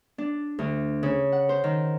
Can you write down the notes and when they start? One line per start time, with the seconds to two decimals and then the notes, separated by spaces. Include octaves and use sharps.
0.18 D4
0.59 D2
1.03 C#3
1.32 F#5
1.49 C5
1.64 D#3